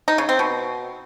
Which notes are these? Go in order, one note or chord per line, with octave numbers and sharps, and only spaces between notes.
D#4
C#3
C4
B2